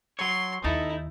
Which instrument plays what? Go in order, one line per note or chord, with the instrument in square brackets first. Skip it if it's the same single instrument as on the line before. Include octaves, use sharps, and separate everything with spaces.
[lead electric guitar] F#3 C#5 [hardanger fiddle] C6
[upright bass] D#2 [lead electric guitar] D#4 A4 [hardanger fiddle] E4